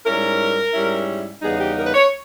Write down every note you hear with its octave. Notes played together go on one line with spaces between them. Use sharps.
G#2 G3 C#4 E4 A#4
G#2 G3 C#4 E4
E2 C#3 G3 B3 D#4 G#4
G4
A#4
B4
C#5